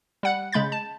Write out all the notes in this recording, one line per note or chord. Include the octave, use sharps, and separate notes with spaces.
G3 F#5 F#6
C#3 G#3 B5 G6 A6
A5